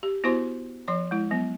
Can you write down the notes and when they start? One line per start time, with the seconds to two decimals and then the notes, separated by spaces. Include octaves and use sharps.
0.03 G4
0.24 B3 E4 F#4 C5 C6
0.88 F3 C#5 C6
1.11 G#3 E4
1.31 F#3 B3